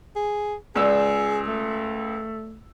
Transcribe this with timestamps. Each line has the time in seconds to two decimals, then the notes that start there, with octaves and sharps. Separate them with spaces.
0.16 G#4
0.75 C#2 G#4 D5 E6
1.47 A3